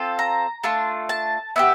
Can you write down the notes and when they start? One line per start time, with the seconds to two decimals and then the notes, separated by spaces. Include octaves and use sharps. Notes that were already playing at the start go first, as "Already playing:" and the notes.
Already playing: C4 F4 A4
0.19 A#5
0.64 A3 D4 F4 A5
1.09 A5
1.56 B3 E4 G4 E5